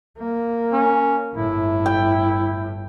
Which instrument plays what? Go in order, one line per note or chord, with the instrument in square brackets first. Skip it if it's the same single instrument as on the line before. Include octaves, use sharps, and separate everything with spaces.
[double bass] A#3
[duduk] C#4
[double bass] G1 A2 [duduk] E4
[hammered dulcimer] G5